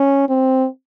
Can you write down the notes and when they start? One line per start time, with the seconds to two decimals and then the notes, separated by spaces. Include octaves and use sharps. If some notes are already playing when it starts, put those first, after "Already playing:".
Already playing: C#4
0.29 C4